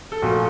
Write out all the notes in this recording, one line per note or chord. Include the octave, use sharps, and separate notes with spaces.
A4
A#1 A#2 A3 F#4